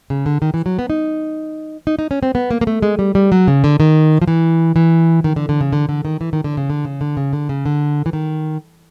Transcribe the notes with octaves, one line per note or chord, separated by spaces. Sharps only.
C#3
D3
D#3
E3
F#3
B3
D#4
D#4
D#4
C#4
C4
B3
A#3
A#3
A3
G#3
G3
G3
F#3
C#3
D3
D#3
F3
E3
E3
D#3
D3
D3
C#3
D3
D3
D#3
E3
D#3
D3
C#3
D3
C#3
D3
C#3
D3
C#3
D3
E3
D#3